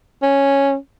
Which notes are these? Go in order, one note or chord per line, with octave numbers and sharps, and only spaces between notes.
C#4